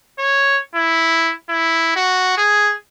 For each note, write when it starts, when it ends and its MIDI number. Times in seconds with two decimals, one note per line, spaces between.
0.19 0.60 73
0.75 1.33 64
1.49 1.95 64
1.96 2.34 66
2.37 2.74 68